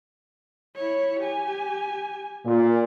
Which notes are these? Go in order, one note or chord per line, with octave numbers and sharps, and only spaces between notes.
E4 C#5
G4 G#5
A#2